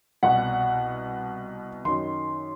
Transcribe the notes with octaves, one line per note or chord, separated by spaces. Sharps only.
C2 B2 F#5
F#2 D#3 C6